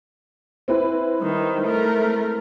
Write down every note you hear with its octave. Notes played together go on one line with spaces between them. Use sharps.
C4 E4 B4
D#3 G3
A3 A#4